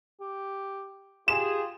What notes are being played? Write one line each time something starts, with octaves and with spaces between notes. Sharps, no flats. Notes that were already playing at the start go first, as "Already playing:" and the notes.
G4
F4 G4 G#4 E7